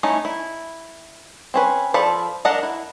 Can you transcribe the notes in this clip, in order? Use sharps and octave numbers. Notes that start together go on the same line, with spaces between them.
A3 C#4 D#4 E4
E4
C4 C#4 B4
F3 A4 D5 B5
D4 A4 A#4 D#5 F#5
E4